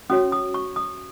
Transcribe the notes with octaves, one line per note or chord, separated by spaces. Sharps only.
C#4 F#4 C#5 D#6
D#6
C#6
D#6